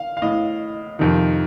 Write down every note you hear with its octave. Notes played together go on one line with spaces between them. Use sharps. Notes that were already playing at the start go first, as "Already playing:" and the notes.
Already playing: F5
F5
A2 D#5
F2 C3 D#3